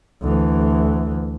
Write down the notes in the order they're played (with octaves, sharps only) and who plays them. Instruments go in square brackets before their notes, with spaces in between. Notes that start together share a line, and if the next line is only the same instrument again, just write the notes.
[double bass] D2 E3